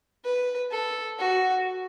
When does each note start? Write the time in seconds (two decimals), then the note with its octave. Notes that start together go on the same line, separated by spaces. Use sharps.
0.24 B4
0.71 A4
1.19 F#4